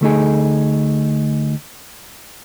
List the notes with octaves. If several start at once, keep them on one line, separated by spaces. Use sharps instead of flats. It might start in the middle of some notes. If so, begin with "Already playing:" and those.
D2 A3 D#4 G#4